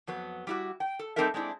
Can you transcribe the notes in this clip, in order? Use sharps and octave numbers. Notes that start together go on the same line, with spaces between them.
F2 F#3 B3
G3 E4 F#4
G5
A4
G3 C4 D#4 A4 A#4 E5
G#3 C4 D4 E4